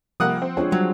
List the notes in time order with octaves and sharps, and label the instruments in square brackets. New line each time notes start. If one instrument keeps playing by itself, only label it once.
[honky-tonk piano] C3 G3 A#3 [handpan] F3 [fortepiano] F#5 D#6
[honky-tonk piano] C4
[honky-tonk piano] G#3 C4 G#4 [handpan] D4 F4 C#5
[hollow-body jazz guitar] F#3 [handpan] G3